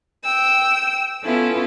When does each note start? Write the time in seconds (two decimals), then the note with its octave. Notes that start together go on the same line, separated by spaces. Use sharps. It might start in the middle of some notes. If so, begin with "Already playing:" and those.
0.25 G5 E6
1.24 B3 C#4 E4 F4 A4